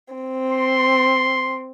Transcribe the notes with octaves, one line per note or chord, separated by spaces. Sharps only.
C4
C6